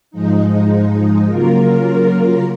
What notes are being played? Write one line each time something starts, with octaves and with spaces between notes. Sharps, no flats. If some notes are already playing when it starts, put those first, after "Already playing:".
G#2 F3 G#3 D#4
C#3 F#3 A#3 F4 A#4